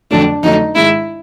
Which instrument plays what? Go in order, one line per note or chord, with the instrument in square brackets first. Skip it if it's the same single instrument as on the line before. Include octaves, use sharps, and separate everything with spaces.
[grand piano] F2 D3 F#3 A3 [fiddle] D4
[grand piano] F2 D3 F#3 A3 [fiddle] D#4
[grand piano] G#2 D#3 G#3 [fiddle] E4